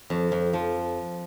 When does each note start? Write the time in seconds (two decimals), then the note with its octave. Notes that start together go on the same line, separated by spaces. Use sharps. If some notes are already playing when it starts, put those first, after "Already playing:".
0.10 F2
0.32 F2
0.53 F3